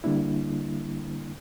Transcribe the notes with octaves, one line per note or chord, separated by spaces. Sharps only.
D3 G3 A#3 D4 E4